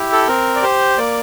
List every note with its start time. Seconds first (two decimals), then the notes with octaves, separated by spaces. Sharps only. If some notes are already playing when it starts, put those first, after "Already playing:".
Already playing: E4 G4
0.12 A4
0.28 C4 A#4
0.55 D5
0.63 G4 C5
0.98 A#3 D5